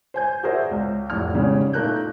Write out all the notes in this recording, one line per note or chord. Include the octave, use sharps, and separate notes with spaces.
C5 G#5 G6
F#4 G#4 A#4 C5 D5 E5
C#2
F1 A2 F3 D5 F6
G#1 G#2 C#3 G3 G#4
A#2 A3 D#4 A#4 F#6 G6